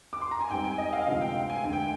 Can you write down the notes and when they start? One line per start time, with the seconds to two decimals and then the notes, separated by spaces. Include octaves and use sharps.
0.13 D6
0.22 C6
0.31 A#5
0.41 G#5
0.50 G#2 G3 C4 G5
0.64 G#5
0.78 D#5
0.93 F5
1.07 D2 C3 F3 G#3 C4 F5
1.21 G5
1.36 G5
1.50 G#5
1.64 D2 D3 G#3 C4 G#5
1.73 G5